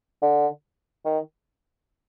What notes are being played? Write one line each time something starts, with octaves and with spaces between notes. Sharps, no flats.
D3
D#3